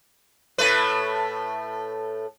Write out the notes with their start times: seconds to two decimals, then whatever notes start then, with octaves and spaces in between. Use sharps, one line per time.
0.58 A2 A3 B4